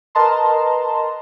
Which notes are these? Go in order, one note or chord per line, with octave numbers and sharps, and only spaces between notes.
A#4 B4 D#5 A5 A#5 C6